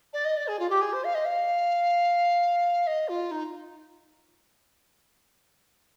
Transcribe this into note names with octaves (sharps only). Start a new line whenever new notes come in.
D5
D#5
D5
G#4
F4
G4
G#4
C5
F5
D#5
F5
D#5
F4
D#4